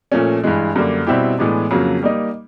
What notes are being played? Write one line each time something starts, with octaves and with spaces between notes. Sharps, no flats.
A#2 F3 A3 C#4
G2 E3 G#3
F#2 D3 G3 A#3
B2 G3 C4 E4 G4
A2 E3 G#3 B3 D4
F2 C#3 F#3 A#3
G3 A#3 D#4